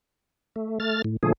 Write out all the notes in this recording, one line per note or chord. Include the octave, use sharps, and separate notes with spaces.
A3
A3 F6 A6
A2
A#2 D3 F3 A3 G#4